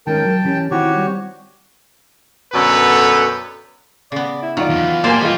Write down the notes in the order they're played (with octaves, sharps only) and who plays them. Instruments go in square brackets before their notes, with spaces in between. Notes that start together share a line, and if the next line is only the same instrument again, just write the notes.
[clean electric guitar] D#3 G#3 C#4 [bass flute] A#4 [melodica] G5 A5
[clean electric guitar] F#3
[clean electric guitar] E3 G4 [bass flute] C#4
[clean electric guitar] D#3 C4 [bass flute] E4 [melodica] F#4 G4 C#5
[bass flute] G3
[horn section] F#2 B2 D3 A4 B4 C#5
[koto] C#3 B3 [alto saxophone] D5
[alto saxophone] E4
[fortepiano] D#3 D5 [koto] F#3 [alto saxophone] F4
[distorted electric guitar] E2
[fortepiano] A#2 A#4 G#5 [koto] A#3 C5 A5 [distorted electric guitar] G4 D5
[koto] E3 [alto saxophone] G#3 [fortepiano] F4 G#4